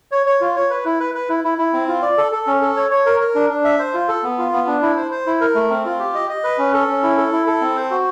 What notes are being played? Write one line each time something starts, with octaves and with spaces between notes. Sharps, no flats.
C#5
C#5
F4
C#5
B4
E4
B4
B4
E4
E4
E4
C4
F4
D5
A4
A4
C#4
A4
C#5
C#5
A#4
A#4
D4
D4
E5
C5
F4
A4
B3
F4
B3
D4
E4
C5
C5
E4
A#4
A3
C4
F4
G4
D#5
D#5
B4
C#4
A4
C#4
E4
A4
E4
A4
C4
C5
F#4